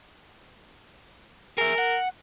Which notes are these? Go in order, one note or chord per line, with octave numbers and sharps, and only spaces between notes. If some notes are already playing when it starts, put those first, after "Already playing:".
G#4 A#4 E5
F#5